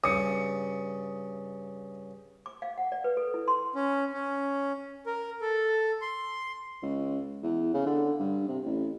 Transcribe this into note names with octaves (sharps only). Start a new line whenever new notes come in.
G2 C#3 D#6 C#7
D6
F5
F#5
D5
B4
A4
E4
C6
C#4
C#4
A#4
A4
C6
C#2
E2
C#3
D3
G2
C3
A1